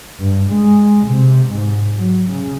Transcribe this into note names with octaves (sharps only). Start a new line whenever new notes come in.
G2
G#3
C3
G#2
F#3
C#3